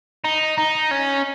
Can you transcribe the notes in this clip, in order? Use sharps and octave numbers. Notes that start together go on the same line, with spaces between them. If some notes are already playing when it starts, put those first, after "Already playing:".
D#4
D#4
C#4